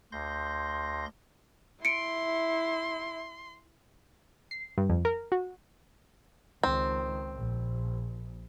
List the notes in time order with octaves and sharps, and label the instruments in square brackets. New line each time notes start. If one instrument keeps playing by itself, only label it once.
[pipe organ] D2 C6 G6 A#6
[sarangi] E4 [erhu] C6 [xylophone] C#7 D7
[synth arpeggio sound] C7
G2
F2
A#4
F#4
[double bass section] C#2 D#3 [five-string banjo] C4
[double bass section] A#1